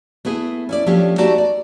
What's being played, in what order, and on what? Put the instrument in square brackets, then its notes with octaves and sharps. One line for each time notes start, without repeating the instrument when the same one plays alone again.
[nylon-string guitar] A3 B3 E4 G#4
C#4 E4 D5
F3 A3 C#4 D4 G4
A3 D#4 F#4 G4 D5 A5
D5